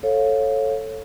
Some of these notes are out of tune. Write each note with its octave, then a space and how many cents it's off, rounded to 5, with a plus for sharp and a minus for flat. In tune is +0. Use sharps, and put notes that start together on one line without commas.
A4 +0 C#5 -15 F5 +10